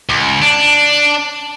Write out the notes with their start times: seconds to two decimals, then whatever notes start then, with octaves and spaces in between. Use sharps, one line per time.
0.09 C#2
0.42 D4